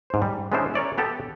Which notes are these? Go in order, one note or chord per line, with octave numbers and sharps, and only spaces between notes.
G#2 C5
G3
G#3 B3 C#4 D4 E4 C5
A#4 C#5 D5 E5
B3 G4 A4 A5